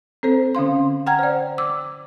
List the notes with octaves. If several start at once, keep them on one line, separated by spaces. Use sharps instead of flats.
C4 A4 C5
D3 C#4 F5 C6
F#5 G5 A#5 F6 G#6
C5 D5
D6 E6